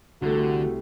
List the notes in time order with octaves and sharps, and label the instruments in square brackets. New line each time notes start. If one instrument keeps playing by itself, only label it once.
[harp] C2 [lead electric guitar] D3 [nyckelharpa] A3 [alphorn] F#4